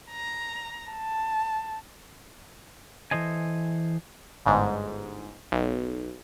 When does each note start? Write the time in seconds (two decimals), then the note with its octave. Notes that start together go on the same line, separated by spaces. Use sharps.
0.11 A#5
0.91 A5
3.11 E3 A4 C5 D#5 G#5
4.46 G1 G#2
5.52 B1